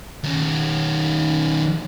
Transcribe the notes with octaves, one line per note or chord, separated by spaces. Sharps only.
D#3 C#4